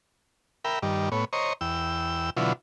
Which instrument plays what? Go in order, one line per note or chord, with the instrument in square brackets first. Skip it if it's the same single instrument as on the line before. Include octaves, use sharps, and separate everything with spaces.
[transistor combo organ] A#4 E5 G5 B5
G2 D#3 G3
A2 B3 C#5
C5 C#5 D#5 A#5 C#6
E2 G5 E6
B2 D3 E3 F#3 E4 F4